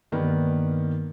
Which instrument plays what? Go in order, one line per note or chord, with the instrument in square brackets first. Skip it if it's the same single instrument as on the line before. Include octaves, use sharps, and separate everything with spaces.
[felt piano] G2 D#3 A#3 B3